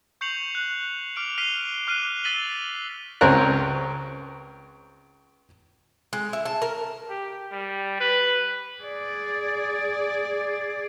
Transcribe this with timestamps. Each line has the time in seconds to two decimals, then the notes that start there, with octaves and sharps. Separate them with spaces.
0.21 C#6 G6 C7 C#7 F7 F#7
0.55 F#6
1.16 D6 F6 D7 F7
1.38 F6 B6 C7 D#7 F7 G7
1.87 D6 F6 F#6 C7 D#7 F7
2.24 E6 A6 B6 D#7 F#7 G7
3.21 C#2 C4 C#4 A#4 F#6
6.13 G#3
6.33 E4
6.45 A5
6.62 A#4
7.10 G4
7.52 G3
8.00 B4
8.82 G#4 D5